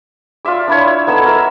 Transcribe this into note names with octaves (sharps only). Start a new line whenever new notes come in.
F4 D5 E5 D6
D4 E4 C#5
B3 D#4 A4 E6
A#4 E5